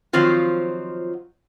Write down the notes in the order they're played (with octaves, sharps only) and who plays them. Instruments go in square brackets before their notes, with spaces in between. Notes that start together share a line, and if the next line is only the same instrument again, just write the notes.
[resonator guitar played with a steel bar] D#3 F3 F#3 C4 F4